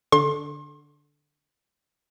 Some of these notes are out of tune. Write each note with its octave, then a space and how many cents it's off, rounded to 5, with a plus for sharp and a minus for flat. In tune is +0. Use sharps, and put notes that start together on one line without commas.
D3 +0 C6 +35